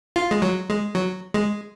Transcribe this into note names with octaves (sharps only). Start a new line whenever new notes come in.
F4
G#3
F#3
G#3
F#3
G#3